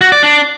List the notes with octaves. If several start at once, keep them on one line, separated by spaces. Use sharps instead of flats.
F#4
D5
D4